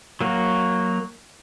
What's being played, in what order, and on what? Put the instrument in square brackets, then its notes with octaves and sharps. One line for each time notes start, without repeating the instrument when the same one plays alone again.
[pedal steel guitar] F#3 A#3 F#4